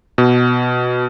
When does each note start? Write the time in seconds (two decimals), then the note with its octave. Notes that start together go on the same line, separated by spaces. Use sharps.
0.18 B2